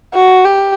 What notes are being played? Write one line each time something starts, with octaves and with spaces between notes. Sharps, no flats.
F#4
G4